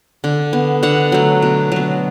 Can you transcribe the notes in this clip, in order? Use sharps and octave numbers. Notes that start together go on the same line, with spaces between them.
D3
B3
D3 F#5
F#3 A3
B2
F#3 B3